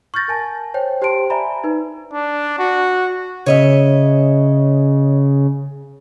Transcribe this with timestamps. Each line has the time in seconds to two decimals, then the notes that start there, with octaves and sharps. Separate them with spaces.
0.14 C#6 F6 G6 A6 A#6
0.28 A#4 G#5 A5
0.74 C5 C#5 G5
1.02 G4 C5 G5 A5 C6 D7
1.30 D5 E5 G#5 A#5 B5
1.64 D#4 B4
2.14 D4
2.59 F#4
3.46 C#3 C#5 D#5 E5